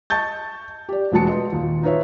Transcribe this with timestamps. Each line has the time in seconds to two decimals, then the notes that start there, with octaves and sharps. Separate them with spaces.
0.10 D#5 A5 C#6 G6 A6
0.89 G4 D5
1.12 E1 F#3 G#3 F#4 A5 C#7
1.28 B4 D#5 C6
1.52 D#2 A#2
1.83 D#4 F4 B4 C#5 E5